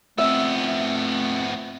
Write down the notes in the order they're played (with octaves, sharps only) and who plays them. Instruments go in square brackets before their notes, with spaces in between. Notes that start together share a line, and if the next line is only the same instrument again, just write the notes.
[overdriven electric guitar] F3 B3 [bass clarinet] A3 [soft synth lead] C4 [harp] E5